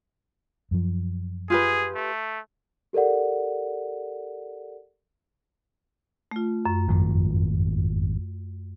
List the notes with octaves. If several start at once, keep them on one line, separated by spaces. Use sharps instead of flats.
F#2 F3
F4 G4 G#4 B4
A3
G4 A4 A#4 D5 F#5
A3 F4
F#2
G#1 F2 D#3